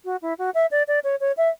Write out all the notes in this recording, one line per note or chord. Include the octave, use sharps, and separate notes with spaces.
F#4
E4
F#4
E5
D5
D5
C#5
C#5
E5